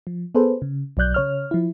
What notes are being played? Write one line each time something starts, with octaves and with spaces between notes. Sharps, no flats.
F3
B3 G#4 A4 B4 C5
C#3
B1 F#3 D5 F#6 G6
C#3 C#5 F6
F3 E4